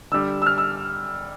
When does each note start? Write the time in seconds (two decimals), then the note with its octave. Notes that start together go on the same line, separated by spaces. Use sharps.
0.12 D3 G3 E6
0.42 E6
0.46 F6
0.58 E6